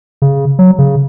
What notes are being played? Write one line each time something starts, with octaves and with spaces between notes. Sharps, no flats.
C#3
F#3
C#3